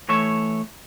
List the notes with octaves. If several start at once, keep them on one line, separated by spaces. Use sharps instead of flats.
E3 A3 C#5 E5